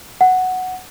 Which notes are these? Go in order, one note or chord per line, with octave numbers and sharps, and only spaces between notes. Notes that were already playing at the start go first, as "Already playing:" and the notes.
F#5